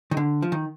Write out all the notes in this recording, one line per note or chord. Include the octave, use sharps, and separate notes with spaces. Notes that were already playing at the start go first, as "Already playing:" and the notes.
D#3
D3
F3
D#3